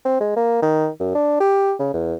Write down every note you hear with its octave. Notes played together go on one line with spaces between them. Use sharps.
C4
G#3
A#3
D#3
F#2
D4
G4
C#3
E2